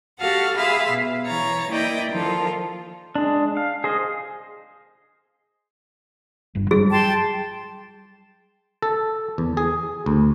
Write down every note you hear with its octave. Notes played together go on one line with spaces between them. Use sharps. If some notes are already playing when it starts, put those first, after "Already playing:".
F#4 G4 A4 F5 F#5
G#4 E5 F5 B5 C6 E6
B2
E3 C#5 A#5 A6
A#3 E4 D5 D#5 G5
D#3 F3 F4 A4
G#3 D4
F5
G#4 C5 D#5
G1 G2
F#3 G3 G#4
G5 A5 C6
A4
E2
G#4
D2